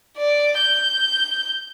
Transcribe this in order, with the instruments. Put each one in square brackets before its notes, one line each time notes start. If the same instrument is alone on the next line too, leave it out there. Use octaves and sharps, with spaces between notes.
[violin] D5
G6